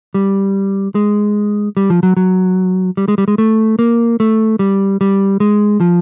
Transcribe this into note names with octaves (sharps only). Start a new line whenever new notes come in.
G3
G#3
G3
F3
F#3
F#3
G3
G#3
G3
G#3
A3
A#3
A3
G3
G3
G#3
F3